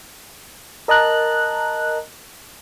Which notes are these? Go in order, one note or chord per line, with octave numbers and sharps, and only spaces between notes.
A#4 D#5 A5 A#5 F#6